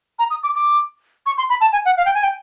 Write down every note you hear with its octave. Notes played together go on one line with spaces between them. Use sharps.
A#5
D#6
D6
D6
C#6
C6
B5
A5
G#5
F#5
F5
G5
G#5
G5